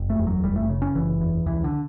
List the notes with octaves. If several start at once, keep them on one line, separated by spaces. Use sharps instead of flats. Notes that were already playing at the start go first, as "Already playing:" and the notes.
Already playing: F#1
A3
E2
F#3
F#1 G3
A3
C#3
C#4
F#1 E3
E2
C#2 E3
D3